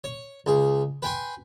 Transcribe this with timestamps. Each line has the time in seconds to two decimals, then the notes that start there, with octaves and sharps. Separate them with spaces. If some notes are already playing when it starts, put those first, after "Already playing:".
0.04 C#5
0.46 C#2 G#4
1.02 B4 G5 G#5 C6